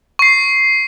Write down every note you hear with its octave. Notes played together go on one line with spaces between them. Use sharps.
C#6 C7